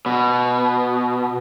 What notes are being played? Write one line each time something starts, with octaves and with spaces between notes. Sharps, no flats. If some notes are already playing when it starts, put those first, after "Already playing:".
B2